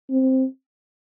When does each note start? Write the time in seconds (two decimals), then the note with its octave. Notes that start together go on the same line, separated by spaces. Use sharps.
0.10 C4